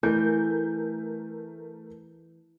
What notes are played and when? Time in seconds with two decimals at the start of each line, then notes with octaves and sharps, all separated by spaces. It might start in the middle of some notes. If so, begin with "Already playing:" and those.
0.03 E3 A3 A#4 G6